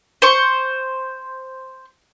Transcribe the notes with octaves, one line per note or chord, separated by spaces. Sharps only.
C5 C#6